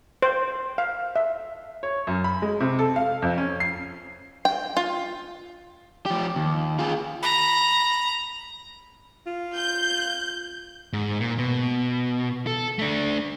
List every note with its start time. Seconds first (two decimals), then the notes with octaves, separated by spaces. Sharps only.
0.22 C5
0.78 F5
1.16 E5
1.83 C#5
2.07 F#2
2.24 B5
2.42 G#3
2.60 C3
2.79 A4
2.96 F5
3.22 F2
3.38 C#4
3.60 C7
4.45 G5
4.77 F4
6.06 F3 G4
6.36 D#2
6.79 F4 G#4
7.23 A#5 B5
9.27 F4
9.56 G6
10.93 G#2
11.20 A#2
11.38 B2
12.47 A4
12.79 A3 D4